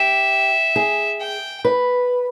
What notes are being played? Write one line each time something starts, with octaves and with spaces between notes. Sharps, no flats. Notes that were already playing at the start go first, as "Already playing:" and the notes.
Already playing: G4 E5
G#4
G5
B4